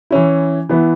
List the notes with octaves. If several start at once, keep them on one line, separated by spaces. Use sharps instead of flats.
E3 C#4 E4
E3 B3 E4